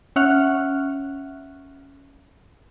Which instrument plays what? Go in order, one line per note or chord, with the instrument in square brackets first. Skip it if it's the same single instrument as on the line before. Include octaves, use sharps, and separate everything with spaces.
[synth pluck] C#4 E5 F#5 C#6 F6 F#6